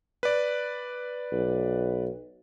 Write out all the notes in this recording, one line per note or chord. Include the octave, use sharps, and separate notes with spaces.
B4 D5
B1